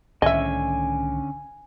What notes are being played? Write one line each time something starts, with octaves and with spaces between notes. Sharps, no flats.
C2 A2 D3 D#3 C#4 D#5 E5 G#5